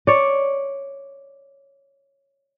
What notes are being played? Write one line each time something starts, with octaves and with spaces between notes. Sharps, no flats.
C#5 D5